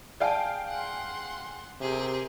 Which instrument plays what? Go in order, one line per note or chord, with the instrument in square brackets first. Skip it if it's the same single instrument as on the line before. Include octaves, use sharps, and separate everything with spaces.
[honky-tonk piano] G#4 F5 G5 [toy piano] D5 A5
[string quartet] F#5 C6
[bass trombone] C3 [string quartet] G4 G#4 A#4